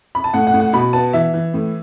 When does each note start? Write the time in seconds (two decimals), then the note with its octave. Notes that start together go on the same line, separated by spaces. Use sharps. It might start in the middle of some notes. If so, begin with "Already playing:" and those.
0.15 B5
0.24 A5
0.33 A2 F#5
0.47 F#5
0.54 A2
0.60 F#5
0.73 B2 B5
0.93 B3 A5
1.13 E3 E5
1.34 E3
1.54 A2